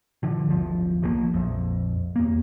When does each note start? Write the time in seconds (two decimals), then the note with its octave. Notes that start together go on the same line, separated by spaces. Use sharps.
0.23 D3 F3
0.48 D1 G1 F3
1.02 B1 F3 F#3 A#3
1.34 A#1 F2
2.16 E2 A#3